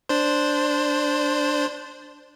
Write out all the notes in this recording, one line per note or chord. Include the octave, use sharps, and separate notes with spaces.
D4 C5